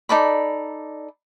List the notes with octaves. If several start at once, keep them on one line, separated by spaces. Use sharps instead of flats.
D#4 A4 D5 B5